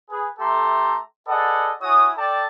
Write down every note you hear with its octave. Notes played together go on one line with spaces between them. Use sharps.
G#4 B4
A3 G4 A4 E5 A#5 C6
G#4 A4 B4 D5 D#5 F#5
E4 F#4 C#5 G#5 D#6
A4 D5 G5 A5